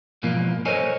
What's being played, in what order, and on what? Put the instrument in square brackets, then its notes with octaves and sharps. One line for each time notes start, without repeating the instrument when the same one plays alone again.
[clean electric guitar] G#2 B2 E3 F3 A#3 F4
A4 A#4 C5 C#5 D#5 G#5